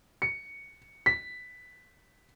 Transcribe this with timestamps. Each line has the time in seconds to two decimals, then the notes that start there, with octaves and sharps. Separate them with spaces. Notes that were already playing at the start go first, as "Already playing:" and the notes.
0.22 C#7
1.06 B6